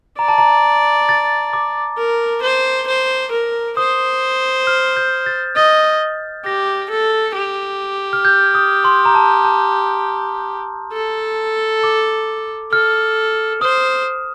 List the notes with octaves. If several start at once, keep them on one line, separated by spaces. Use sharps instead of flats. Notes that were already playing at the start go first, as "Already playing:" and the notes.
D5 A#5
A5
A#5
A6
D6
A#4
C5
C5
A#4
C5 D#6
F6
G6
A6
D#5 A6
G4 A#6
A4
G4
F6
G6
D#6
C6
A#5
A5
A5
A4
D6
A4 F6
C5 D#6